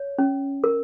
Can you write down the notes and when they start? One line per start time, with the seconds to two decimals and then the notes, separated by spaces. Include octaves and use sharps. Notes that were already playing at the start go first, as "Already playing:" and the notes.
Already playing: C#5
0.18 C#4
0.64 A#4